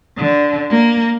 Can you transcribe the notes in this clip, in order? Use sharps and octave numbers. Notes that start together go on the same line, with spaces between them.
D3
A#3